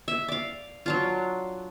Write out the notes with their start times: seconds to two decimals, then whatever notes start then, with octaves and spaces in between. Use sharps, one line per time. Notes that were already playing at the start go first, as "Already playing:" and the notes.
0.08 E5
0.28 D5 F5
0.86 F#3 D4 F4